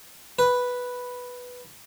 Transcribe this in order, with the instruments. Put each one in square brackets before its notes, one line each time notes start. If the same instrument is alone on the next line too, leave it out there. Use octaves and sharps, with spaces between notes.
[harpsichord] B4